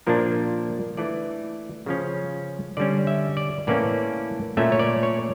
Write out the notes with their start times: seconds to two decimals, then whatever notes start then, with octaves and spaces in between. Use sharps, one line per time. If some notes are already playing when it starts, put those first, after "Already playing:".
0.07 A#2 F3 A#3 D4 A#4
0.97 E3 A3 D4 D5
1.86 C#3 F3 C#4
2.77 D3 G3 C#4 D5
3.07 E5
3.37 D5
3.67 A2 E3 A#3 C#4 D5
4.57 A#2 A3 C#4 E5
4.72 C#5
4.79 D5
5.03 C#5